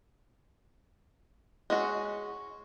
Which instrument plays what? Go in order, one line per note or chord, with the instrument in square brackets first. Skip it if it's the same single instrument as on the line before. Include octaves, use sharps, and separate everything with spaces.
[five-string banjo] G#3 C#4 F#4